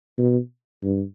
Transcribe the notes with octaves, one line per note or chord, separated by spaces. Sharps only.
B2
G2